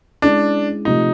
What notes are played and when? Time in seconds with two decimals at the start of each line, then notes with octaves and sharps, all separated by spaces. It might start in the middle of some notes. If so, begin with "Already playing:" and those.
0.22 G#3 C#4 D4 E4 G#4
0.85 C3 F3 A3 D#4